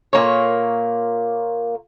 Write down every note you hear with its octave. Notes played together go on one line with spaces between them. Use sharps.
A#2 A#3 C#5